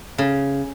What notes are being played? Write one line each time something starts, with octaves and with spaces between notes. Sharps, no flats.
C#3